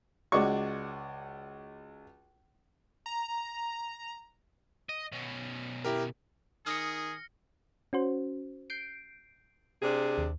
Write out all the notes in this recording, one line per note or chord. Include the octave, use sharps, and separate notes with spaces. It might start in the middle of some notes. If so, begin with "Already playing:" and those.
C#2 G#3 F#4 D5 C#6
A#5
D#5
B2 C#4
E4 G4 A#4
D#3 G#4 D#6 F6 A#6 C#7
C#4 F#4 C5
G6 C7 D7
C3 D4 G#4
D#2